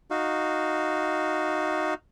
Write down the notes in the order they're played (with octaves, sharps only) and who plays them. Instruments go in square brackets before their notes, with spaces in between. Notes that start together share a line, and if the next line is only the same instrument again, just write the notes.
[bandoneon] D#4 F#4 F5